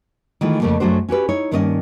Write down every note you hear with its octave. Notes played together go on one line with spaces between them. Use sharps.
D#3 E3 G#3 A3 F4
F2 G#2 C#3 A3 A#3
F#2 F#3 A3 D4 F#4 C5
C#4 F#4 G4 B4
D#4 E4 C#5
G2 D#3 A#3 C#4 B4 D#5